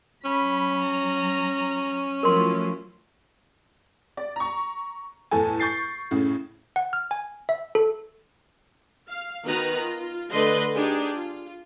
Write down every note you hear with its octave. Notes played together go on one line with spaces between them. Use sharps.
F#3 C#4 B5
A#5
F3 F#3 A3 E4 F4 A#4 C6
D5
A#5 C#6
E2 A2 A4 G#5
C#6 G6 A6 C7
A2 C#3
F#5
F6
G#5
E5
A4
F5
D#3 B3 F#4 B4 A#5
F4
D3 A3 B4 D#5 C6
D4 D#4 G4 G#4
F4